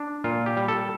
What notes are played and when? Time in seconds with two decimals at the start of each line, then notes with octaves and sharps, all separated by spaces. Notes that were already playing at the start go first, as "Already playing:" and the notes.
Already playing: D4
0.24 A#2 F4
0.46 G4
0.57 G3
0.68 A4